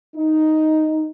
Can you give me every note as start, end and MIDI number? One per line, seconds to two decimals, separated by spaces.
0.16 1.11 63